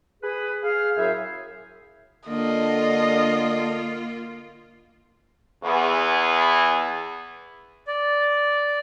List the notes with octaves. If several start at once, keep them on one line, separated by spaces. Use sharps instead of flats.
G#4 B4
G#4 F5
F#2 A2 F#3 G#4 C5 E5
D3 A#3 F4 D#5
E2 E3 B3 G#4
D5